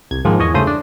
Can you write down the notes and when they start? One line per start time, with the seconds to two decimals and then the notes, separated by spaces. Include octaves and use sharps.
0.11 C2 G#6
0.25 G#2 D#3 F3 G#3 A#3
0.39 E2 C#5 D#5 G#5
0.54 G2 C#3 A3 C5 D#6
0.67 D4